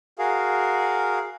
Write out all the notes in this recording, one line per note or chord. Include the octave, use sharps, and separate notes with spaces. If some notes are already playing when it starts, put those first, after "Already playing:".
F#4 G#4 A#4 F5